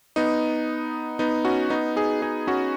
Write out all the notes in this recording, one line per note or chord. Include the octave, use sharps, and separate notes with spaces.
B3 D#4
B3 D#4
C#4 F#4
B3 D#4
D#4 G#4
D#4 G#4
C#4 F#4